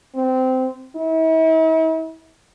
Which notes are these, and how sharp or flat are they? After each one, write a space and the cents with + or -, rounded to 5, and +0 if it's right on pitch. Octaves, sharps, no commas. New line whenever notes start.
C4 -20
E4 -45